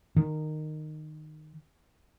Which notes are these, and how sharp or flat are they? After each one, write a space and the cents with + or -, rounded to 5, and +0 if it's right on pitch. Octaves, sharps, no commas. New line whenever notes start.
D#3 -15